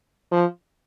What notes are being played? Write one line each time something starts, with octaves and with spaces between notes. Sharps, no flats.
F3